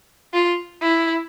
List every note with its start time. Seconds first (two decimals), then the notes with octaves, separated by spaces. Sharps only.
0.34 F4
0.82 E4